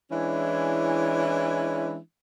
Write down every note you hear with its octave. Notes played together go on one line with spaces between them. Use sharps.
E3 G#3 C#4 D4 E4